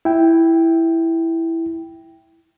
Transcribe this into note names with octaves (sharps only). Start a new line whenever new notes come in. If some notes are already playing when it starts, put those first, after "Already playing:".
E4 G5